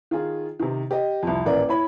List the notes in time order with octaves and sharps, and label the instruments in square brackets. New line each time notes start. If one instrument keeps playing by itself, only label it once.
[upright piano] D#3 F4 G#4
C3 D#3
G4 D#5
C2 F2
D#1 A1 A#4 D5
E4 C#5 B5